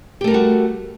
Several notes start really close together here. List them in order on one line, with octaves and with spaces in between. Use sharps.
G4 A3 A#4 G3 F#4